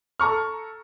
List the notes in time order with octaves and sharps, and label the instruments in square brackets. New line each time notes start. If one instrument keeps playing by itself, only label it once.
[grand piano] A4 A#5 C#6 F6